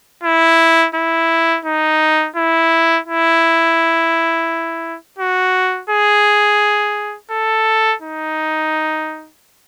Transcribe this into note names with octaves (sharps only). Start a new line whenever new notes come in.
E4
E4
D#4
E4
E4
F#4
G#4
A4
D#4